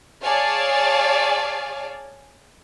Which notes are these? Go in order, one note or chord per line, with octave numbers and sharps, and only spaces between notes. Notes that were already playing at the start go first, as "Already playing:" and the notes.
G#4 C#5 D5 F5 G#5 A5